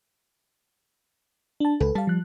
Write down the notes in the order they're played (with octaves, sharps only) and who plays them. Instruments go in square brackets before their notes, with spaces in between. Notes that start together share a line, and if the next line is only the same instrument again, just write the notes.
[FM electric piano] D4 A5
[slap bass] C#2 [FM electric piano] A4 B4
[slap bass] G3 [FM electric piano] F5 A5
[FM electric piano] F3 F#6